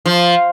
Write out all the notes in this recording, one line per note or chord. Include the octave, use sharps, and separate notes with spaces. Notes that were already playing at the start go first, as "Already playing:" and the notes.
F3